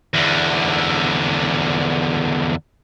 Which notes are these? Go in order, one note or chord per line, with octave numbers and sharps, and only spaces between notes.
E2 D3